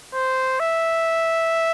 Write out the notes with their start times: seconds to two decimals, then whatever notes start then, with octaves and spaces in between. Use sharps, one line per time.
0.15 C5
0.60 E5